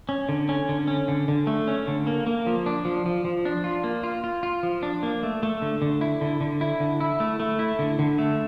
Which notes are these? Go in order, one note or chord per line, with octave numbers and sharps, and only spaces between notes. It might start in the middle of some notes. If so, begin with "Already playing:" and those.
C#4
D3
C#4
D3
C#4
D3
D3
A3
C#4
D3
A#3
A#3
F3
D4
F3
F3
F3
D4
F4
A#3
F4
F4
F4
F3
D4
A#3
A3
A3
D3
D3
E4
D3
D3
E4
D3
E4
A3
A3
E4
D3
D3
A3